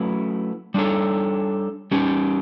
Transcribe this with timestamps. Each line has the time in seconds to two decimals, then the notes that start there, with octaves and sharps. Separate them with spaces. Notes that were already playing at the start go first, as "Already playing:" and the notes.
Already playing: F#3 A3 C#4 E4 B4
0.74 G3 D4 A4 C#5
1.91 G3 C#4 G4